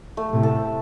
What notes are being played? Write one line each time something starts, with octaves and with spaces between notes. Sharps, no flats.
A3
A2 C3
A4